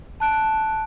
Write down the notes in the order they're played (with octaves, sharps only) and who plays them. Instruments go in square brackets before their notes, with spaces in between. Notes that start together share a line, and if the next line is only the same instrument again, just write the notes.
[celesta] A5 F#6 D7